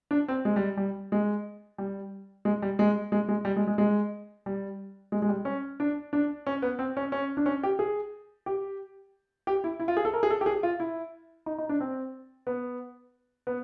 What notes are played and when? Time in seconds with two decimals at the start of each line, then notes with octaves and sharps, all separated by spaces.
0.11 D4
0.28 C4
0.45 G#3
0.56 G3
0.77 G3
1.12 G#3
1.78 G3
2.45 G#3
2.62 G3
2.79 G#3
3.12 G#3
3.29 G#3
3.45 G3
3.57 G#3
3.67 G#3
3.78 G#3
4.46 G3
5.12 G#3
5.22 G#3
5.29 G3
5.45 C#4
5.80 D4
6.13 D4
6.47 C#4
6.62 B3
6.79 C4
6.97 C#4
7.12 C#4
7.37 D4
7.46 C#4
7.63 G4
7.79 G#4
8.46 G4
9.47 G4
9.64 E4
9.80 E4
9.88 F4
9.97 G#4
10.05 A4
10.14 A#4
10.23 G#4
10.30 A4
10.41 G4
10.46 G#4
10.63 F4
10.80 E4
11.46 D#4
11.58 D#4
11.69 D4
11.80 C4
12.47 B3
13.47 B3